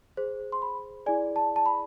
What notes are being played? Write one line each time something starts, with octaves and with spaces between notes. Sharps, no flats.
G#4 C5
C6
B5
E4 G#4 D5 G#5
A5
A5
B5